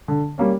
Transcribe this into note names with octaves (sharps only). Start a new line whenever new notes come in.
D3
G3 A#3 C#4